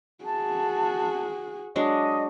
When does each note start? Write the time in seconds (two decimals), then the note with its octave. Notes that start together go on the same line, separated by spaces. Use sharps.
0.24 F#4 G#4 A5
1.76 F#3 G#3 D4 D#5